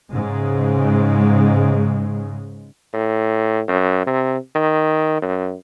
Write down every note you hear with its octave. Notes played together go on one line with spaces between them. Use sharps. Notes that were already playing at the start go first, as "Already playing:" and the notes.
G#2 C#3 G#3
A2
F#2
C3
D#3
F#2